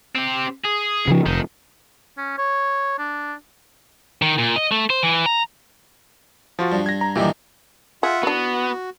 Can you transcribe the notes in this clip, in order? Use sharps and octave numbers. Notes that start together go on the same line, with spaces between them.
C4 G4
G#4
C#3 F3
F1 D#3
C#4
C#5
D4
D#3
A#2
D#5
A3
C5
E3
A#5
F3 F4 F#4
G2
G#6 A#6
A#5
G2 A#2 D#3 E3 G4
F4 G#4 E5 F#5
E3 B3 D4 F#4